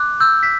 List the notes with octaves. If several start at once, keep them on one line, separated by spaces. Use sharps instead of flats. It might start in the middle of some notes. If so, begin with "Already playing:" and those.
Already playing: D6 F#6
E6 G6
B6